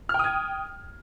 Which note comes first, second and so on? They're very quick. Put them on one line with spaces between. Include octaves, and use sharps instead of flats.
F6 G5 D#6 G#6